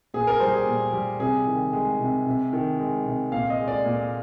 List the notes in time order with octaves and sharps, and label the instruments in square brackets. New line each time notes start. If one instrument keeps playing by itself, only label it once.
[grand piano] A#2 G#4
A#4
G3 C5
G#4
A#2
G3
C3 G#4
D#3
G#3
C3
C3
D#3
G#3
C3
A#2 F5
D#5
G#3
D5
A#2